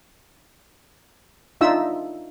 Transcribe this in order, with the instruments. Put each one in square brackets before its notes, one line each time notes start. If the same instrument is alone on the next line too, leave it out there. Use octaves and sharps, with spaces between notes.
[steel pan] D4 D#4 F4 E5 E6